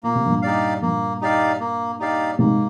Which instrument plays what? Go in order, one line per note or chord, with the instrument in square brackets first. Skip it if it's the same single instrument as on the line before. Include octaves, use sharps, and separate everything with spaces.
[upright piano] A#2 [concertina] A#3
[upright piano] C3
G2 A#2
[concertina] D#4 G4 D5 F5
[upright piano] G2 A#2 [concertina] A#3
[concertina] D#4 G4 D5 F5
A#3
D#4 G4 D5 F5
[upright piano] G#2 C3 [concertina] A#3